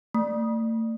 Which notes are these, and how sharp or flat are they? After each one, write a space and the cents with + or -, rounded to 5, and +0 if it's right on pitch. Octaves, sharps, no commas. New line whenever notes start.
A3 +40